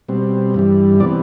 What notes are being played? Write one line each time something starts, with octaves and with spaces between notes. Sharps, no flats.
B2 G3 C4
G2 E3 G3
C3 E3 B3 D5